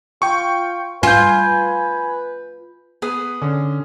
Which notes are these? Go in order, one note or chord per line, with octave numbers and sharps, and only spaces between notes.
F4 G5 C#6
F4 B4 G#5 G6
B3 G#4 B4
D3 C#4